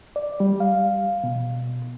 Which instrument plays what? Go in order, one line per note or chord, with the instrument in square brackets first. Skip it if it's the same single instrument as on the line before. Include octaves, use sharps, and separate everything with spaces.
[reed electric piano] D5
G3
F5
B2